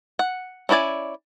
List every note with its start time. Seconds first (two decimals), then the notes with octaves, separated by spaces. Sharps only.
0.19 F#5
0.69 C#4 E4 F#4 D5 G#5